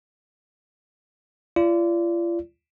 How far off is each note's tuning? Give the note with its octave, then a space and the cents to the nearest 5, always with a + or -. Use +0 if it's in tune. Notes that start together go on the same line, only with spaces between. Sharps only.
F4 -40 D5 -20